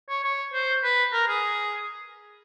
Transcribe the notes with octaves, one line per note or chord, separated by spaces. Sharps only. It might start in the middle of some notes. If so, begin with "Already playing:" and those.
C#5
C#5
C5
B4
A#4
G#4